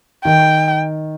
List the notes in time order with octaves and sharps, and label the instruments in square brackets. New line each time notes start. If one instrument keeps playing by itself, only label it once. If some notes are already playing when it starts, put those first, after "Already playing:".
[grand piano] D#3 [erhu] G5